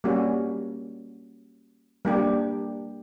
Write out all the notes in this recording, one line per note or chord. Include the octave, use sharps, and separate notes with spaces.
G3 A#3 C#4 F#4
G3 A#3 D4 G4